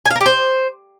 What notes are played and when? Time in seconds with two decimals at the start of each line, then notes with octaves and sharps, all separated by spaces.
0.05 G#5
0.11 F5
0.16 A#4
0.21 G4
0.26 C5